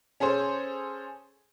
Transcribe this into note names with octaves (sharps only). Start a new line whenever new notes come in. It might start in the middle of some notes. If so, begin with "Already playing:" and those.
C#4 G#4 A4 C5